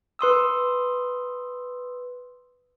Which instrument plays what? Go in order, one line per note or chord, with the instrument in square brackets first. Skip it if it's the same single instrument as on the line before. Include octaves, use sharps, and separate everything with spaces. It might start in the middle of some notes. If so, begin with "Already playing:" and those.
[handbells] B4 C6 D#6 E6